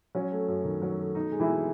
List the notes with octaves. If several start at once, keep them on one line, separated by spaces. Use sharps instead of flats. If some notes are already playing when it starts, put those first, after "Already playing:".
F#3 C#4
A3
F#2
D#3
F#3
A3
B2 D#4
G#3
E3 E4
B2